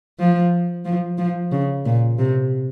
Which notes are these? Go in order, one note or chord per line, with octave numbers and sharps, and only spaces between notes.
F3
F3
F3
C#3
A#2
C3